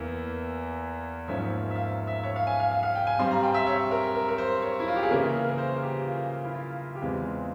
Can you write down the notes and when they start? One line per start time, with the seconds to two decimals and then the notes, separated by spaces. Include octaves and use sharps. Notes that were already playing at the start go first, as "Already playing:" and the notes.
Already playing: E2 E3 A#3
1.28 G#2 F3 A#3 C#4 E5
1.70 E5
1.75 F5
2.07 E5
2.23 C#5
2.36 F5
2.47 G#5
2.60 F5
2.71 F5
2.83 F5
2.95 G5
3.07 G#5
3.19 G2 G3 C4 C6
3.31 A#5
3.43 G5
3.54 E5
3.66 C#5
3.91 A#4
4.15 A#4
4.28 A#4
4.38 C5
4.62 C#5
4.80 E4
4.88 F4
4.96 G4
5.03 G#4
5.10 C#3 E3 A#3 C#4 A#4
5.49 A#4
5.58 C5
5.82 G4
6.06 F4
6.44 E4
6.54 F4
6.95 G4
7.01 E2 E3 G#3 C4 F4